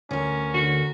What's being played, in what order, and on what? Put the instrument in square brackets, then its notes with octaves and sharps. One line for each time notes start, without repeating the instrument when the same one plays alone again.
[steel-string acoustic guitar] D2 A#4 [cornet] C#4
[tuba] D3 [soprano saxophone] F#4